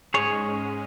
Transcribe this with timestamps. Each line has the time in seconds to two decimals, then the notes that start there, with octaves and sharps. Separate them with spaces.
0.14 G#2 G#3 C#4 G#4 C#5